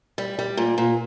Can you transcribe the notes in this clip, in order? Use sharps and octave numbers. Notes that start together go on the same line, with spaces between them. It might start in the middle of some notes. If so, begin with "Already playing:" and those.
G3
G3
A#2
A#2